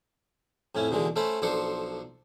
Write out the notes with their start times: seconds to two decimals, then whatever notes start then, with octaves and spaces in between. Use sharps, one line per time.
0.75 F2 A2 C#4 E4
0.91 D#2 B2 D3 E3 G#3
1.16 A3 C#4 A4 C5 B5
1.42 B1 F3 D4 A4 C5 C#6